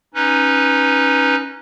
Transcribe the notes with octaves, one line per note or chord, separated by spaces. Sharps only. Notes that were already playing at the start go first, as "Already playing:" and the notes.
C#4 D#4 B4